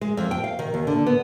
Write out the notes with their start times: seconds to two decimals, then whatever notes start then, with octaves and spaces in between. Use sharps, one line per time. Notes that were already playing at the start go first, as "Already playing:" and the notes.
0.01 G#3
0.17 F2
0.31 G5
0.44 F5
0.59 D#3
0.74 D#2
0.87 D3
1.07 B3